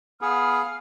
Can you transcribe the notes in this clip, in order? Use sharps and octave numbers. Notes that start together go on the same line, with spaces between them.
B3 G#4 F5 F6